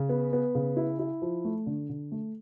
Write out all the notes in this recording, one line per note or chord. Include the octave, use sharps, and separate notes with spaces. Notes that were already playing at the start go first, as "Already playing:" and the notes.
Already playing: C#3
B3
B3
C#3
E4
E4
F3
A3
D3
D3
A3